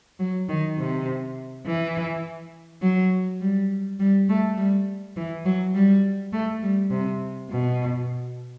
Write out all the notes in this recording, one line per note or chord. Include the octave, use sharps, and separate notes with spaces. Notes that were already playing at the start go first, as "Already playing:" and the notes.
F#3
D#3
C3
E3
F#3
G3
G3
A3
G3
E3
F#3
G3
A3
G3
C3
B2